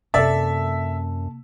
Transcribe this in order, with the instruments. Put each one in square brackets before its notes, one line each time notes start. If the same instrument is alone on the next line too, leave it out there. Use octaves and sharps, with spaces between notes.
[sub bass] F#2 [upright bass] C3 A#3 [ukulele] A4 D5 [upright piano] E5